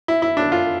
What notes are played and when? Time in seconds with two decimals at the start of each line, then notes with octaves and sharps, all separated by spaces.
0.08 E4
0.22 E4
0.37 D4
0.52 F4